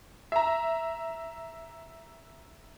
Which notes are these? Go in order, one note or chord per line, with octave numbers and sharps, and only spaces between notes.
E5 A#5